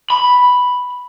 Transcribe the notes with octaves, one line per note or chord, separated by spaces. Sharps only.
B5